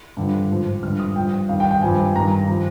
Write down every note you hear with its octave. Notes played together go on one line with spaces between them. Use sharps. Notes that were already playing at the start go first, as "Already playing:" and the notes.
G2 D3 F3
G#2 F3
G2 D3 F3 F6
D#6
G2 F3 G5
G2 D#3 F5
G5
G5
G2 F3 G#5
G2 D#3 A#5
F3